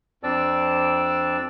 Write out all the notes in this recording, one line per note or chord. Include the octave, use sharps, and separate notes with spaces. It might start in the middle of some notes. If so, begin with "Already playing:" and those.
F2 C4 D4 D5 A5 E6